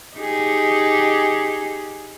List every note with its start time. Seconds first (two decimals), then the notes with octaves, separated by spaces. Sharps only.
0.16 D#4 G4 G#4